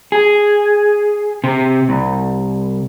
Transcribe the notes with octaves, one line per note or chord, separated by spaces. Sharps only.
G#4
C3
C2